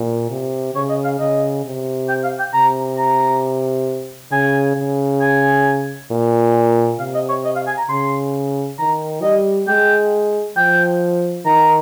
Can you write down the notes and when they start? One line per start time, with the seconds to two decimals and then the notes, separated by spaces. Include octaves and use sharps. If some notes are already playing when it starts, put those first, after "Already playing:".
Already playing: A#2
0.30 C3
0.74 C#3 C#5
0.89 D#5
1.04 F5
1.19 C#3 D#5
1.65 C3
2.09 G5
2.24 F5
2.39 G5
2.53 C3 A#5
2.98 A#5
4.31 C#3 G#5
4.76 C#3
5.21 G#5
6.11 A#2
6.99 C3 F5
7.14 D#5
7.29 C#5
7.45 D#5
7.56 F5
7.67 G#5
7.78 A#5
7.89 C#3 C6
8.79 D#3 A#5
9.22 G3 D#5
9.68 G#3 G5
10.57 F3 G5
11.45 D#3 A#5